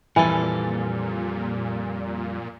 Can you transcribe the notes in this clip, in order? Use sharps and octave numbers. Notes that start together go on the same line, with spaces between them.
F2 A#2 E3 G3 A4 G#5